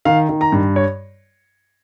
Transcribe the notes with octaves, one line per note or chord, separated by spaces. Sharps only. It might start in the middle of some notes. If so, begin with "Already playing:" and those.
D#3 F5
D#3
A#5
G2
C#5